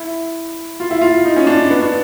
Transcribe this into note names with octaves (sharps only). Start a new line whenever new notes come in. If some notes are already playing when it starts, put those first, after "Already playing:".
Already playing: E4
F4
E4
F4
D#4
C#4
D4
B3
D4